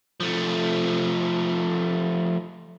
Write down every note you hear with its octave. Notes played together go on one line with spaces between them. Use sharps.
F3 A3